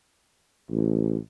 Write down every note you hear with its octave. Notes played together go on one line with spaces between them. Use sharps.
A1